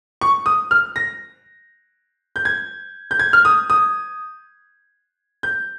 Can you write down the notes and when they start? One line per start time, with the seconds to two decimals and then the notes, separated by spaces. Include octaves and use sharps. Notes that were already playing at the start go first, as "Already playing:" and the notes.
0.21 C#6
0.46 D#6
0.71 F6
0.96 A#6
2.36 G6
2.45 G#6
3.11 G6
3.19 G#6
3.33 F6
3.45 D#6
3.70 D#6
5.43 G6